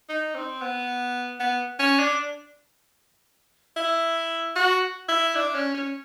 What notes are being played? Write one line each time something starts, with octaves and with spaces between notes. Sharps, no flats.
D#4
C4
B3
B3
C#4
D4
E4
F#4
E4
D4
C#4
C#4